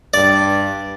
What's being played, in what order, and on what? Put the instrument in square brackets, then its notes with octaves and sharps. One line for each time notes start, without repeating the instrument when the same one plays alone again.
[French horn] G2 [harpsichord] D5